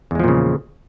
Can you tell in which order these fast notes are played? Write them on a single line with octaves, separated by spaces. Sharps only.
E2 G#3 F3 A#2 C#3